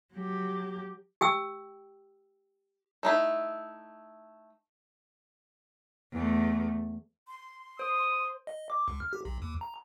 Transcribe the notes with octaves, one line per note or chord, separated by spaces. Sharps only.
F#3 G4
G4 G5 E6
A3 D#4 E4
E2 A3
C6
C5 D#6
D#5
D6
C#2
F6
G4
B1
D#2
A#5